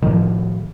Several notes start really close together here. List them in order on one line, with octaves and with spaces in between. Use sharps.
D#3 A2 F3